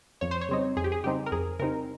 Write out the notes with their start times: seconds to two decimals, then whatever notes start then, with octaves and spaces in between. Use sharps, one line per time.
0.21 F2 C#5
0.31 C5
0.41 C#5
0.49 C#3 G3 C4 D#4
0.77 F2 G#4
0.84 G4
0.92 G#4
1.04 C#3 G3 C4 D#4 G4
1.26 A#4
1.32 F2 G#4
1.59 C#3 G3 C4 D#4 A#4